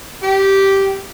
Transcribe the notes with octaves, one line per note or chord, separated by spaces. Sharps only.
G4